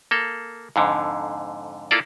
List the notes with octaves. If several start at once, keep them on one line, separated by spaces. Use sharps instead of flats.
A#3 A4
F2 G#2 D3
A#3 E4 F4 A4 D5